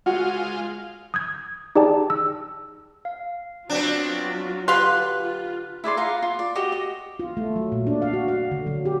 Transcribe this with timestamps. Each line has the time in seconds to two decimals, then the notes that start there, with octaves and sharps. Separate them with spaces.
0.06 G#3 F4 F#4
1.14 D#6 G6 G#6
1.75 D#4 G4 G#4 D5 G5 A5
2.10 E6
3.05 F5
3.69 F#3 B3 C4 D4 F4
4.68 D3 G4 B4 F5 C6 F#6
5.21 F4
5.84 E4 G#4 D5 C6
5.97 F4 F5 F#5 A#5
6.22 F4
6.39 D5
6.55 F#4 G4 D#5
6.72 D#5
7.19 F4
7.37 A3
7.56 F#3
7.72 A#2
7.87 D4
8.02 F5
8.13 F#4
8.28 F5
8.51 D3
8.67 F#3
8.85 G4